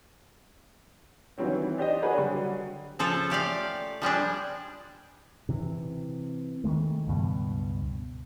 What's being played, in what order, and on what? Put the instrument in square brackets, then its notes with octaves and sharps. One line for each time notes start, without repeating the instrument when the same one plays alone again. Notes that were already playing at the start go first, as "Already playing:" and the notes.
[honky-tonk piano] D#3 E3 F#3 G3 C4 C#4
E3
D4 G4 C5 D#5
D4 F#4 G#4 A#4 B4 C#5
D3 F#3 G3
[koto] C#3 F3 F4 A4
A3 G4 D5 F5
F3 G3 G#3 D4
[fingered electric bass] C3 E3
D#3 E3 G#3 A3
C#2 G2 B2